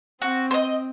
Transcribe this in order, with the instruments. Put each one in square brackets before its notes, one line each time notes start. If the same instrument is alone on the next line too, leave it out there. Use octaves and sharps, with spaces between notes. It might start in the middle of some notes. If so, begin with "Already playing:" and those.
[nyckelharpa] C4 [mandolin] F#4
[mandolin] C5
D#5